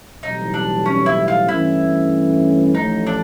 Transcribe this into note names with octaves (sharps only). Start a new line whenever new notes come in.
B1 A2 E3 G3 C4 D#4
D4
C#4
E4
F4
G2 E3 A3 C#4 E4
A1 A2 F3 A3 D#4
D4